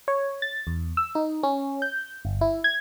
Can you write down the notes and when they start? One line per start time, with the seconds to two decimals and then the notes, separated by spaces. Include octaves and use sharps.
0.08 C#5
0.42 A6
0.67 E2
0.97 E6
1.15 D#4
1.43 C#4
1.82 G6
2.25 G1
2.41 E4
2.64 G#6